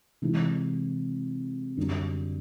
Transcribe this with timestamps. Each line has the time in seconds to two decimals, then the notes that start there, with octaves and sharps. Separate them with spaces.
0.22 C3 E3 G#3 C4 E4
1.77 F#2 D3 G3